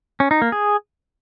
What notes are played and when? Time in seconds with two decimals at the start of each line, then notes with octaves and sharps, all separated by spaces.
0.20 C#4
0.31 D#4
0.42 A#3
0.52 G#4